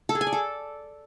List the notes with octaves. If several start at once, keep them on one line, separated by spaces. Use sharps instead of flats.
A4
G#4
G#5
D5
A4